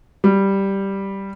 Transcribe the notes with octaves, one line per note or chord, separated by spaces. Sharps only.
G3